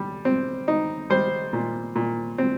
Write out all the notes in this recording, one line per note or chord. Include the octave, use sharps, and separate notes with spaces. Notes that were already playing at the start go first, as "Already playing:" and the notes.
Already playing: G3
C4
D#4
G3 C5
A#2
A#2
C4